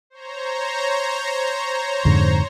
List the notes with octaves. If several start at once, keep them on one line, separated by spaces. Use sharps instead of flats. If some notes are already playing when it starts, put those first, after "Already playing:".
C5 C#5 A#5
F2 G#2 D3